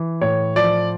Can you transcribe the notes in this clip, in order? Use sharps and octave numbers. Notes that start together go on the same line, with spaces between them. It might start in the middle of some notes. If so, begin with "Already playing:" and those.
Already playing: E3
A2 C#5
F3 D5